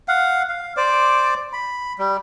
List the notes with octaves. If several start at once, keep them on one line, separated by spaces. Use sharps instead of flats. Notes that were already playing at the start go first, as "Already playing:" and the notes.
F5 F#5
F5
C5 D5 D6
B5
G3